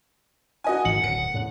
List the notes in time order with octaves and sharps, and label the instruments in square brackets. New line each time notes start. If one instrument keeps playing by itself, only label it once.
[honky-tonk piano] F#4 D#5 G#5
[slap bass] G#1 [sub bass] D#3 [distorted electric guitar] F#5 [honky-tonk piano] F#7
[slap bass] D1 [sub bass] D2 [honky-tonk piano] C#7
[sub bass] E2 [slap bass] A2 C#3